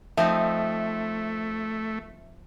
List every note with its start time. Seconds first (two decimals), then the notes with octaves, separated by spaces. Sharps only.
0.17 F3 A3 C4 D#4 E5